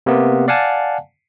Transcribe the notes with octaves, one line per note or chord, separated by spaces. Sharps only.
C3 A#3 B3
D5 F5 F#5 G#5 A5